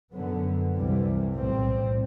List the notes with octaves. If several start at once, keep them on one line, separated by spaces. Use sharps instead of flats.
F#2 D3 F#3 B3
C2 C3 E3 G3
B1 A2 G3 C4